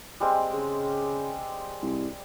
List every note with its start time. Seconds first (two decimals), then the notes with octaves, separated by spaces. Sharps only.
0.20 G3 G#3 C4
0.53 C#3
1.83 C2